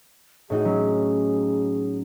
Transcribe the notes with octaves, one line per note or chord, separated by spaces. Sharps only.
A2 D#4 F#4 G#4
F#3 C#4 F#4